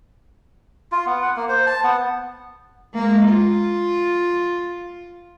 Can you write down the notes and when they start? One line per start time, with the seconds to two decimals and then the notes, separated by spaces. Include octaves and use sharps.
0.92 F4
1.06 B3
1.22 F#5
1.36 A#3
1.49 C5
1.66 A5
1.84 B3
2.94 G#3 A#3
3.29 F4